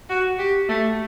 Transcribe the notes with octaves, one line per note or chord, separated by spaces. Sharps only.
F#4
G4
A3